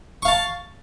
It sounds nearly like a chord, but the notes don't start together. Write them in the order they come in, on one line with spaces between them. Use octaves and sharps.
C#6 F5 A5